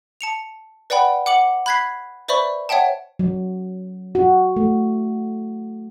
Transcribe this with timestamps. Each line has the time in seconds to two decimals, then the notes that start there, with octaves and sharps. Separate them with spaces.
0.21 A5 C#7 F7
0.90 B4 D5 F#5 G5 B5
1.26 F#5 D6 C#7 F#7
1.66 B5 F#6 G#6 B6 C7
2.28 B4 C5 D5 E5 B5 C#6
2.69 C#5 E5 F#5 G5 A5
3.19 F#3
4.15 F#4
4.56 A3